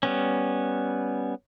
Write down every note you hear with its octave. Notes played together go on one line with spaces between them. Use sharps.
G3 B3 C#4